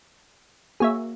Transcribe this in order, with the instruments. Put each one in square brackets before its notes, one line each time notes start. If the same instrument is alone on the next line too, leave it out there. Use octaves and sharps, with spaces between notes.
[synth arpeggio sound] A#3 F#4 [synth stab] G#4 C#5 E5